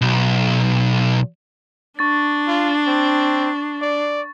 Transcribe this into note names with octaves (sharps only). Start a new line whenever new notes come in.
B1
D4 C#6 A6
F4
C4
D5